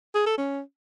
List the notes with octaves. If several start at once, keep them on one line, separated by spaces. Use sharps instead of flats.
G#4
A4
C#4